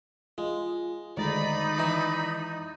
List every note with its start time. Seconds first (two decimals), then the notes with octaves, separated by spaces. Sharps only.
0.38 G#3 F4
1.17 D2 D#3 G#3 D#4 D5 B5 A6
1.78 E3 E4